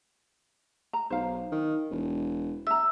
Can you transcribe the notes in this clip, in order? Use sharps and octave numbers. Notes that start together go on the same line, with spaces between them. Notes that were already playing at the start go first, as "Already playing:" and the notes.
A#5
B1 C5 F5
D#3
E1
E5 A#5 E6